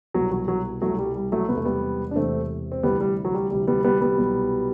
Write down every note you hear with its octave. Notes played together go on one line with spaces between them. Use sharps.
C2 B2 F#3
F#3
F#3
C2 B2 F#3 A3
G3
G3
F#3 A3
E1 E2 C3 B3
A3
G3 B3
D4
E1 E2 C3 A3 C4
C4
D2 C3 E3 G3 B3
G3
F#3
G3
D2 C3 E3 G3
G3 B3
G3 B3
G3 B3
C2 B2 F#3